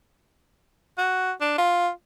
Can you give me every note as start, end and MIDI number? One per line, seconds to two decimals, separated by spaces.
0.98 1.32 66
1.41 1.55 62
1.58 1.89 65